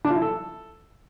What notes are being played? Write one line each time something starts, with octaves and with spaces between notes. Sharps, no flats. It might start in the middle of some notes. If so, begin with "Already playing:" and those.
D4
F4
E4
A4